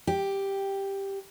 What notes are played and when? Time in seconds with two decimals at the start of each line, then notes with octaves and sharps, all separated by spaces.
0.07 G4